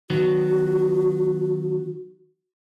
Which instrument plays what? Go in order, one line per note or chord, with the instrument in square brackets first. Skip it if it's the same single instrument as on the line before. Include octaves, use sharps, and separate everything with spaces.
[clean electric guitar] D#3 F#3 B3 [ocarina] F#4